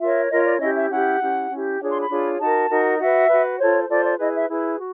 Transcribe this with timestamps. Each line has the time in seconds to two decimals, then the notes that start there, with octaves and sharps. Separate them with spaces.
0.01 F4 A#4 C#5 E5
0.30 F4 A#4 C#5 D#5
0.45 D5
0.61 C#4 E4 G4 D#5
0.75 E5
0.91 C#4 E4 G4 F#5
1.20 C#4 E4 G4
1.50 C#4 E4 G4
1.79 D4 F4 G#4 C#5 G5
1.90 C6
2.00 B5
2.10 D4 F4 G#4 C#5
2.40 D#4 F#4 A#4 A5
2.70 D#4 F#4 A#4
2.99 F#4 B4 E5
3.29 F#4 B4
3.58 F4 A4 C5 C#5
3.89 F4 A4 C5 D5
4.04 D5
4.18 E4 G#4 B4 D#5
4.33 E5
4.49 E4 G#4 B4
4.78 F#4